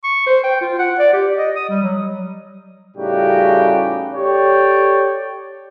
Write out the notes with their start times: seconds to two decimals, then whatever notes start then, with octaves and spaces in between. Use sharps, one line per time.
0.04 C#6
0.26 C5
0.43 G5
0.61 F4
0.79 F#5
0.98 D5
1.13 G4
1.36 D#5
1.56 D#6
1.69 G3
1.83 F#3
2.97 A2 C#3 G3 D#4 F#4 G4
4.14 G4 A4 C#5 D5 G5